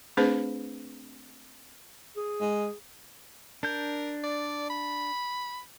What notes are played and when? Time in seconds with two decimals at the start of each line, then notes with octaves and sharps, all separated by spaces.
0.17 A3 C4 D4 G#4 B4 C5
2.17 G#4
2.41 G#3
3.63 D4 A#4 G6
4.23 D5
4.70 B5